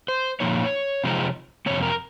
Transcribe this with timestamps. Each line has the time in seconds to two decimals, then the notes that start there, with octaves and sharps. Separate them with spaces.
0.08 C5
0.40 A#2 F3 A#3 D#4 C#5
1.04 C3 F3 G#3 C4 D#4
1.66 F2 C3 D#3 A#3 C#5
1.83 A#4